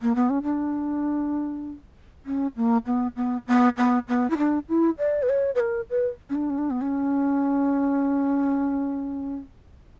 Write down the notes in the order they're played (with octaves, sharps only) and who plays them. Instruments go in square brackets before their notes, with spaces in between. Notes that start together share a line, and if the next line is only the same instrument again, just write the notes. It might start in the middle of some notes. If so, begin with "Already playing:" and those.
[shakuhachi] A#3
B3
C#4
D4
C#4
A#3
B3
B3
B3
B3
B3
E4
D4
E4
D5
B4
C#5
B4
A#4
B4
C#4
D4
C#4
D4
B3
C#4